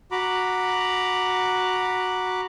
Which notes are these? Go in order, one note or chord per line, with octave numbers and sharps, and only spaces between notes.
F#4 A#5 B5 D6